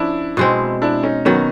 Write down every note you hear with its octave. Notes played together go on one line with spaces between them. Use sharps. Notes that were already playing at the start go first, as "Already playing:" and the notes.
Already playing: F3 C#4 D4 E4
B2 G#3 C4
D4 E4
C#4 D#4
D#3 F#3 B3 C#4